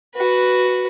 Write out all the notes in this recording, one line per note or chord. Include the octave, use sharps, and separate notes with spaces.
F#4 B4